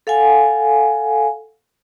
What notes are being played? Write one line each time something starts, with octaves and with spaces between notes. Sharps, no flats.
A4 F5 F#5 G#5